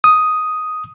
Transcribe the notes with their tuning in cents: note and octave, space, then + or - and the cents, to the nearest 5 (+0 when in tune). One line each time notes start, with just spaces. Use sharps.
D#6 +5